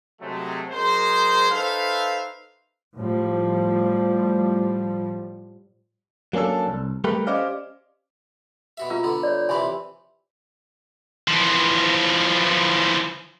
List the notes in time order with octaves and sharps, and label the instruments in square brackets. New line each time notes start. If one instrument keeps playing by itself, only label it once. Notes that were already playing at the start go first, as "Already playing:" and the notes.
[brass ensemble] C3 F#3 G#3 A3
F#2 G#3 G#4 A#4 C5
D#4 A4 B4 C5 E5 F5
[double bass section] A2 F3 G3
[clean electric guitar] F#3 A#3 C#4 D4 A4
C2
G3 A3 G4 A#4 B4
C#4 G4 C5 D5 D#5 F5
[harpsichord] B2 F#4 E5
[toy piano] F4 A#5 E6
[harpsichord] D3 B3
[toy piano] C#5 D5
[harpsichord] C3 E3 B4 [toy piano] G#5 C6
[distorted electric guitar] E3 F3